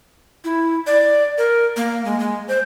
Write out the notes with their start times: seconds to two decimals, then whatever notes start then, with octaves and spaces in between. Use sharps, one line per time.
0.44 E4
0.87 D5
1.38 A#4
1.77 A#3
2.05 G#3
2.20 G#3
2.48 C5